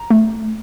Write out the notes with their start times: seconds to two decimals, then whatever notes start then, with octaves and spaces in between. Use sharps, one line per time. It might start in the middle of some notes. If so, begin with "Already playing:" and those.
Already playing: A#5
0.10 A3